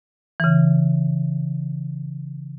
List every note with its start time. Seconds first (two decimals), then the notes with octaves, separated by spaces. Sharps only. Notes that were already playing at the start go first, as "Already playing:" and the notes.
0.40 C#3 E3